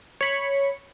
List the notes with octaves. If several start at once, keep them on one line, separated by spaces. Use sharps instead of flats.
C#5 B5 C#7